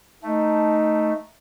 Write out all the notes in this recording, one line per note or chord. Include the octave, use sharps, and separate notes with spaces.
A3 D#4 A5